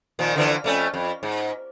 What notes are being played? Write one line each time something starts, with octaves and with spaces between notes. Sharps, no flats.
A#2 D#3 F3
D3 E3 F3
F2 A3 C#4
F2
G#2